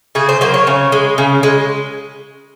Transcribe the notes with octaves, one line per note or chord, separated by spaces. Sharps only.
C#3 G#4
C5
F#3 A#3 C5
C#5
C#3
G#3
C#3
G#3